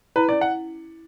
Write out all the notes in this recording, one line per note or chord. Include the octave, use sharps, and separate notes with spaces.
E4 B4
C#4 D5
F#5